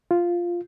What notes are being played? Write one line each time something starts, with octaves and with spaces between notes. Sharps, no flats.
F4